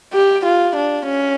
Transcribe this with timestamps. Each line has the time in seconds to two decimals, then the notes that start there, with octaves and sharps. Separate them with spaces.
0.14 G4
0.45 F4
0.76 D4
1.06 C#4